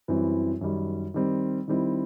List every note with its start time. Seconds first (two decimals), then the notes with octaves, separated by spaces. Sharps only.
0.08 F#2 E3 G3 C4 E4
0.61 F#2 D#3 G3
1.14 D#3 G3 C4
1.68 D#3 G3 C4 E4